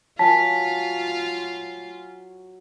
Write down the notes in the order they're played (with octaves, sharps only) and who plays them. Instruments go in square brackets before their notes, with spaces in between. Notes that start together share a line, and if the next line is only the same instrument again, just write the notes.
[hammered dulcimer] F#3 [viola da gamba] F4 [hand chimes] G#5 B6 [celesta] A5